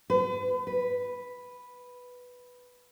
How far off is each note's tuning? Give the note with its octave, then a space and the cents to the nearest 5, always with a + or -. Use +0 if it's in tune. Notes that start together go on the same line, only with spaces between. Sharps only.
B4 +40
B4 +0